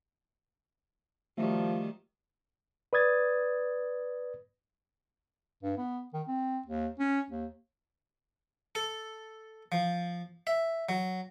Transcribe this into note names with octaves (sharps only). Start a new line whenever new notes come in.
D#3 F3 G3 A3 F#4
B4 D5 D#6 G#6 A6
G2
B3
D#3
C4
D#2
C#4
D#2
A4
F3
E5
F#3